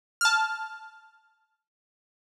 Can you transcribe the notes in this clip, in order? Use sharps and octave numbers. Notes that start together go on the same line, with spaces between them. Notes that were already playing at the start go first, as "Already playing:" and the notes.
A5 F6